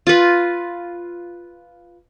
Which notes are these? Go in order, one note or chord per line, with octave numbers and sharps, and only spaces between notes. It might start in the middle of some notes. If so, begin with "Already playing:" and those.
F4 B4